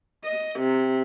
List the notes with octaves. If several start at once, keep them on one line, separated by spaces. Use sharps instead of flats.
D#5
C3